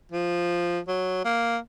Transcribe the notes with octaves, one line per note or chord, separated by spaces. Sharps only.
F3
F#3
A#3